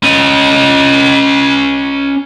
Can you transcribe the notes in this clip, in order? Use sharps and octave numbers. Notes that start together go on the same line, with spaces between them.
C#4 D#5